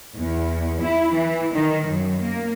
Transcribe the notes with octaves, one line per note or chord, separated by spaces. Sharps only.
E2
E4
E3
D#3
F#2
A#3